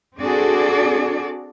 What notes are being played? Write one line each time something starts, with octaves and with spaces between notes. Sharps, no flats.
C4 D4 F#4 G#4 A4 D5